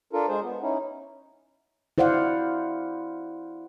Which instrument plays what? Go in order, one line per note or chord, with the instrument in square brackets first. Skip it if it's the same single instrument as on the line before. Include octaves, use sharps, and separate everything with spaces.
[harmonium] D4 F4 A4 A#4
G#3 G#4 C5
B3
C#4 D#4 E4
[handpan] E4 C5 D5 F5 F#5